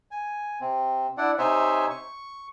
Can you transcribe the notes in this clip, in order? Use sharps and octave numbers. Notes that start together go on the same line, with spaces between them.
G#5
C3 C4
D4 E4 D5 F#5
C3 D#4 C5 C#5 E5 G#5
C#6